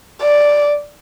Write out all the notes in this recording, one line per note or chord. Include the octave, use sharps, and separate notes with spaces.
D5